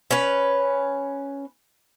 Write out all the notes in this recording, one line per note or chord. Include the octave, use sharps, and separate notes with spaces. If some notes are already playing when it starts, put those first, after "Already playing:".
C#4 B4